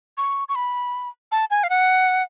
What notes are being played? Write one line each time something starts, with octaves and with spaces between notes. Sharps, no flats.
C#6
C#6
B5
A5
G#5
F5
F#5